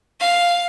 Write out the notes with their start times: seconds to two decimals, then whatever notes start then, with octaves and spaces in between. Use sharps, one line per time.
0.20 F5